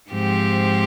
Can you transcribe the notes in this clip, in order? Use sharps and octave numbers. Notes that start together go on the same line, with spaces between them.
G#2 F3 C4 G4